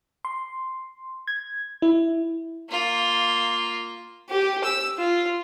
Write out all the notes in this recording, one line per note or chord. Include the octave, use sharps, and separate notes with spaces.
C6
G#6
E4
A#3 F4
G4
E6
F4